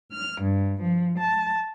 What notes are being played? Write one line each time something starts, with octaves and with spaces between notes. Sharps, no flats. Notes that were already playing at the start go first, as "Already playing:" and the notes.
F6
G2
F3
A5